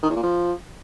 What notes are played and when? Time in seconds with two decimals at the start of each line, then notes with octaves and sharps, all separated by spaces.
0.03 D#3
0.09 E2
0.16 A#2
0.23 F3